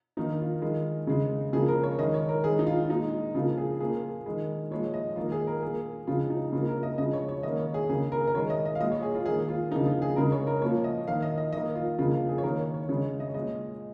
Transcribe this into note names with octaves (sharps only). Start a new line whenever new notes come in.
D#3 A#3 D#4
F4
D#3 G#3
C#3 G#3
C#3 F3 A#3 G#4
A#4
C#5
D#3 G#3 D#5
C#5
A#4
D#3 G#3 G#4
D#4
F4
F4
A#2 G#3 D#4
C#3 F3 A#3 F4
G#4
A#2 F3 A#3 G#4
D#3 G#3
A#2 F3 G#3 C#5
D#5
D#3 A#3 F4
G#4
A#4
A#2 A#3 G#4
C#3 F3 G#3 F4
D#4
C#3 A#3 F4
A#4
D#5
C#3 F3 G#3 D#5
C#5
C#5
D#3 A#3 D#5
C#5
G#4
C#3 A#3 G#4
A#4
A#4
D#3 G#3 C#5
D#5
D#5
F5
A#2 G#3 D#5
C#5
G#4
F4
D#3 A#3 G#4
F4
C#3 F3 A#3 D#4
F4
G#4
C#3 G#3 A#4
C#5
A#4
A#2 F3 A#3 C#5
D#5
D#3 A#3 F5
D#5
D#5
D#3 A#3 D#5
F4
C#3 F3 A#3 F4
F4
G#4
C#5
D#3 A#3 A#4
C#5
C#5
C#3 G#3 C#5
D#5
C#5
A#2 G#3 D#5